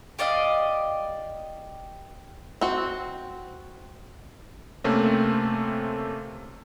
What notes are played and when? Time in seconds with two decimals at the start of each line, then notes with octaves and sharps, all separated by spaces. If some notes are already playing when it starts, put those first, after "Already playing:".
0.19 G4 D5 D#5 F5
2.61 C4 F#4
4.84 C3 A3 A#3 C4 C#4